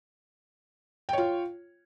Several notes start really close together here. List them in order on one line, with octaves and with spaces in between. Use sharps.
G5 C#5 F4